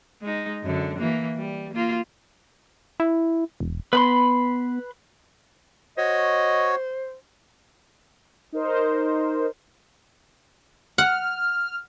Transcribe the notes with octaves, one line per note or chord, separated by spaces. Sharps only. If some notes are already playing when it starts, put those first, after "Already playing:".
G#3 D#4
F#2 D3
E3 A#3
G3
A#3 F4
E4
E1
B3 B4 B5 C6
F#4 C5 C#5 D#5
D#4 A#4 C5
F#5 F6